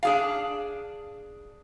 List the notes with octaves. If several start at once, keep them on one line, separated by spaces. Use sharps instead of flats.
D4 G#4 F5